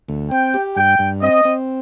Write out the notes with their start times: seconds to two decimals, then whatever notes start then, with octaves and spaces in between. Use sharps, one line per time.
0.09 D2
0.31 C4 G5
0.54 G4
0.76 G2 G5
0.99 G2
1.22 C4 D#5
1.45 C4